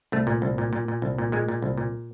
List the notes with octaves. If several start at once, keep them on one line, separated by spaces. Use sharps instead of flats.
C2 A3
A#2
C2
A#2
A#2
A#2
C2
A#2
A#2 G#3
A#2
C2
A#2